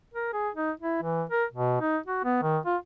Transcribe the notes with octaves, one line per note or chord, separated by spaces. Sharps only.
A#4
G#4
D#4
E4
E3
A#4
B2
D#4
F#4
B3
D#3
F4